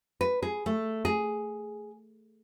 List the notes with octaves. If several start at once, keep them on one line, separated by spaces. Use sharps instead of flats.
B4
G#4
A3
G#4